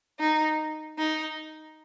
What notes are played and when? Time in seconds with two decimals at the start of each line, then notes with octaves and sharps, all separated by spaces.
0.19 D#4
0.98 D#4